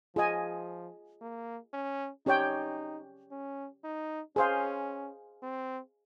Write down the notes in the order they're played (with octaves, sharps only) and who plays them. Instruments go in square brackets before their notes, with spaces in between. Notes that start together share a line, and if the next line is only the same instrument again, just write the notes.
[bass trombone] F3 [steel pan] F4 G#4 D#5 G#5
[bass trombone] A#3
C#4
[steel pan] C#4 G4 C#5 G5 [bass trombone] D#4
[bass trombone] C#4
D#4
[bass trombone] C#4 [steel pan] G#4 C5 F5
[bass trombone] C4